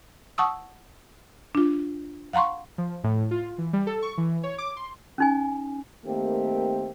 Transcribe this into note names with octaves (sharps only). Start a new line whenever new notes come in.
F#5 A5 C#6 D#6 E6
D4 F4
F5 F#5 A#5 C6 C#6
F3
A2
F4
E3
G3
A4
C#6
E3
C#5
D6
C6
C#4 D#4 G#5
D#3 A3 A#3 C4 G4